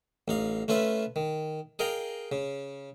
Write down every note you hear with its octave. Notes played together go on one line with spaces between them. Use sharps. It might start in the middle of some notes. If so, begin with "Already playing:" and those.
A1 D#4 F5
A3 C#4 F4 B4 E5
D#3
G#4 A#4 D#5 F5 G5
C#3